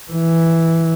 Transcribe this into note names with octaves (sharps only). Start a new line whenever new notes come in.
E3